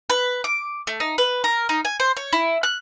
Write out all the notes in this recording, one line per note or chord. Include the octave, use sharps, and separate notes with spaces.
B4
D6
A3
D#4
B4
A#4
D#4
G#5
C5
C#5
E4
F#6